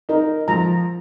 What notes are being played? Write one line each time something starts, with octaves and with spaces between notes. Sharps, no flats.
D#4 A#4
F3 A#5